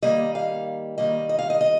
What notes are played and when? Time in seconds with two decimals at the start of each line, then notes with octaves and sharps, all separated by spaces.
0.02 D#3 G3 A#3 D#5
0.35 F5
0.98 D#3 G3 A#3 D#5
1.29 D#5
1.39 F5
1.50 D#5
1.61 D#5